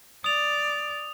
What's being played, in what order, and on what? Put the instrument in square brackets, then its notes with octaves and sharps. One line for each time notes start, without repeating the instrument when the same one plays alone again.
[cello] D5 [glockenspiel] D#6 F7